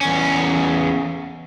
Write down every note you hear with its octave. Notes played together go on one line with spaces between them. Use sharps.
E2 C#4